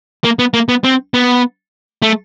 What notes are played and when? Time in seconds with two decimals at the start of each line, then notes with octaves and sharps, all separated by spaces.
0.24 A#3
0.39 B3
0.54 A#3
0.69 B3
0.84 C4
1.14 B3
2.02 A3